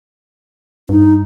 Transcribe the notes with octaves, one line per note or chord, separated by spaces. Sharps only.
G2 D#4